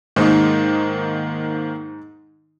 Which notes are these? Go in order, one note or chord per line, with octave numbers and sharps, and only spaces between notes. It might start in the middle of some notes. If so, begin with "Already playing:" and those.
G#2 D#3 A#3 D#4 C5